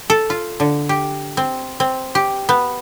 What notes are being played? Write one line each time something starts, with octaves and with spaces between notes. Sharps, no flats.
A4
F4
D3
G4
C4
C4
G4
B3